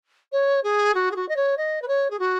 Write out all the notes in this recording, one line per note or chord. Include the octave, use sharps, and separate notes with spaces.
C#5
G#4
F#4
G#4
F#4
D#5
C#5
D#5
B4
C#5
G#4
F#4